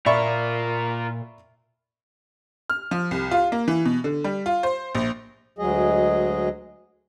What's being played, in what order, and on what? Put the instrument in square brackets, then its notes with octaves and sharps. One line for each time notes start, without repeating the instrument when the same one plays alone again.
[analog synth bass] A#2 [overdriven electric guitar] F4 A#4 [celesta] D5 [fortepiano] E5 B5 C#6
[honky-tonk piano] F6
F3
C2
F4
A#3
E3
B2
D3
G3
F4
C5
A#1
[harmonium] D2 F#3 G#3 G#4 D#5